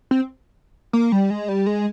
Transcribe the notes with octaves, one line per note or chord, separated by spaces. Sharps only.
C4
A#3
G3
G#3
G3
G#3